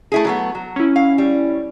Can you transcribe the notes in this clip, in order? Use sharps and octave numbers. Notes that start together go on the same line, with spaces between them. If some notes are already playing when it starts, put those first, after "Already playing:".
A3 E4 G#4
F#3 A3 B3
F#3
C#4 E4
F5
G3